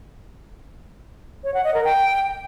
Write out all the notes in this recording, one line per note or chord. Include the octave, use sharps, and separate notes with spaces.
C#5
F#5
D#5
A#4
G5